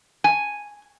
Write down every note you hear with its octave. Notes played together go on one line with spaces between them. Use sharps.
G#5